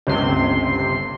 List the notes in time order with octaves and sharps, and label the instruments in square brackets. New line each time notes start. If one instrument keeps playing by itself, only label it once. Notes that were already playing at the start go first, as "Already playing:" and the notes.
[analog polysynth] G1 C3 C6 [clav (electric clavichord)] C#2